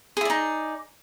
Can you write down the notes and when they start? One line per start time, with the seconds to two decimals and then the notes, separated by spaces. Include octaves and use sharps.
0.17 G#4
0.21 E4
0.25 D5
0.30 D#4